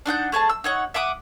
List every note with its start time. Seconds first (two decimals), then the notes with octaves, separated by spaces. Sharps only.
0.06 D4 D#4 F#5 G6
0.32 A3 G#4 C5 A5
0.49 E6
0.64 D#4 C#5 F#5
0.94 E5 F#5 D6 D#6